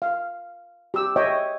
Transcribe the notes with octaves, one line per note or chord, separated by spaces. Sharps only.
F5
G4 E6
C#5 D#5 E5 G5